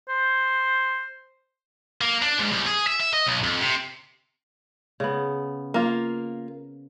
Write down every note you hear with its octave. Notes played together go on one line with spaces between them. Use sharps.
C5
A#3
D4
G#2
C2
G#4
E5
E5
D#5
B1
F2
C3
C#3 B3
A#3 F4